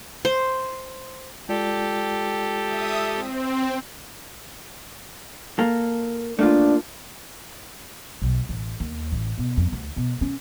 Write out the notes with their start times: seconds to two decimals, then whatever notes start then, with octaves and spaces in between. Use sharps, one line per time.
0.25 C5
1.49 G#3 F4 G4 A4 D5
2.64 E5 D#6
3.15 C4
5.59 A#3 A4
6.39 A3 A#3 D4 F4
8.22 B1
8.49 A1
8.80 D#2
9.12 A1
9.38 B2
9.57 F2
9.72 D2
9.96 B2
10.21 C#4